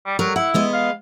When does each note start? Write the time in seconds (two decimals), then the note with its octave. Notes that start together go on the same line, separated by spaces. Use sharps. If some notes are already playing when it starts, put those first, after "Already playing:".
0.06 G3
0.19 F#3 G3 A#4
0.36 E4 F#5
0.54 G#3 B3 D#5
0.73 F5